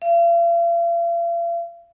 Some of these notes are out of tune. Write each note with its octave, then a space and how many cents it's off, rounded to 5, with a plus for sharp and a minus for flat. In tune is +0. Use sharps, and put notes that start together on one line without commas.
F5 -45